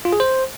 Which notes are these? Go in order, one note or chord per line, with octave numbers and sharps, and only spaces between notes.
F4
G#4
C5